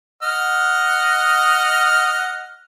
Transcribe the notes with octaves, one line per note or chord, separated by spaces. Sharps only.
D#5 F#5 F6